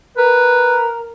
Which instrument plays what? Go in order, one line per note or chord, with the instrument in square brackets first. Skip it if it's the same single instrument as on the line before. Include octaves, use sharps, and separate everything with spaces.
[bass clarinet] A#4 [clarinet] B4